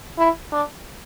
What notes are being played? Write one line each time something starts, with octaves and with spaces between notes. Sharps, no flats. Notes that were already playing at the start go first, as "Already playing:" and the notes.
E4
D4